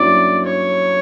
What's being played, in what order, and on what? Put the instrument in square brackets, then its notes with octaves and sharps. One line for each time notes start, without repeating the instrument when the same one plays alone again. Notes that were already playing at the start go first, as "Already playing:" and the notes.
Already playing: [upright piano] G2 F#3 A#3 C#4 E4 [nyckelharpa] D5
[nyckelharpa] C#5